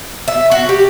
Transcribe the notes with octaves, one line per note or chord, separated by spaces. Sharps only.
E5
F#4
G4